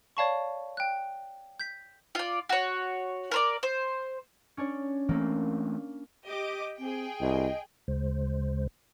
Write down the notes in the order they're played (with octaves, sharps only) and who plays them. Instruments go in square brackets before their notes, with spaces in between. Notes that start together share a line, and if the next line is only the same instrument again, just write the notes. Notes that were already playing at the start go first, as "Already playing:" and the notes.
[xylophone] C#5 D5 F5 A5 B5 C#6
G5 F#6
G6 B6
[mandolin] F4 D5
F#4 C#5
A#4 C5 D5
C5
[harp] C#4 D4 C#5
[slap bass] E3 A3 C4 [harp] A#3
[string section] G4 D#5 D6
[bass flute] C4 [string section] G#4 G5
[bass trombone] C2 [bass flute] D#5
[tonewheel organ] D2 C#3 G#3 C5